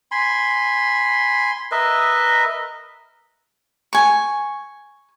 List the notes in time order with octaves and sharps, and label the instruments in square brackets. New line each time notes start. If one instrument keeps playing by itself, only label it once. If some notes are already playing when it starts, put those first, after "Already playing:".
[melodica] G#5 B5 C6
A#4 B4 D#5 E5
[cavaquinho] G#5 C#6